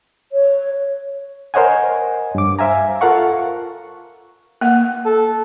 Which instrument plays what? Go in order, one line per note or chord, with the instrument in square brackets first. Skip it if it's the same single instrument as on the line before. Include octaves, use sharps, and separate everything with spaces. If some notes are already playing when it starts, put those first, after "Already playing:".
[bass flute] C#5
[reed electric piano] A#4 C5 C#5 D#5 F#5 G#5
G2 D6
C5 E5 F5 G#5 A#5
F4 A4 A#4 F5 F#5 C#6
[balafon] A#3 F#5
[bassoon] A4